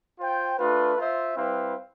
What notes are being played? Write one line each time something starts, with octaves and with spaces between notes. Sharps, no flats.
F4 C5 G5
A3 D4 F4 B4
F4 C5 E5
G3 C4 E4 B4 F5